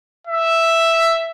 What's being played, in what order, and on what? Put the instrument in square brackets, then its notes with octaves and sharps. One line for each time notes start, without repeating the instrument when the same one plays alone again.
[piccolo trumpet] E5